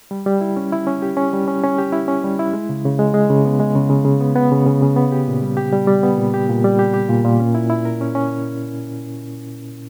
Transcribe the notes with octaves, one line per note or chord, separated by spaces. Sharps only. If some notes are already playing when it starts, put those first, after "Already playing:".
G3
G3
E4
C#4
E4
C#4
G4
C#4
G3
C#4
C#4
G4
E4
C#4
G3
E4
G#3
C#3
C#3
G#3
G#3
C#3
B3
G#3
C#3
C#3
C#3
B3
B3
C#3
C#3
C#3
B3
G4
A#2
G3
G4
G3
G3
B3
A#2
G4
A#2
G3
G4
G4
A#2
A#2
C#4
E4
E4
A#4
C#4
C#4